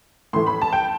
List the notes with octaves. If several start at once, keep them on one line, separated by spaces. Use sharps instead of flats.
A2 E3 A3 C6
B5
A5
G5